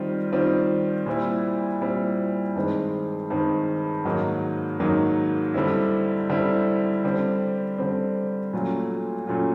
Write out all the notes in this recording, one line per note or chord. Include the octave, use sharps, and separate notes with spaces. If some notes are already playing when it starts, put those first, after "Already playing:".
Already playing: D#3 G3 C4 F4
D#3 G3 C4 F4
A#2 G3 C4 E4
A#2 G3 C4 E4
G2 D#3 G#3 C4
G2 D#3 G#3 C4
G#2 D#3 F#3 A#3
G#2 D#3 F#3 A#3
D3 G3 C4 E4
D3 G3 C4 E4
D3 G3 C4
D3 G3 C4
A#2 F#3 A3 C#4 F4
A#2 F#3 A3 C#4 F4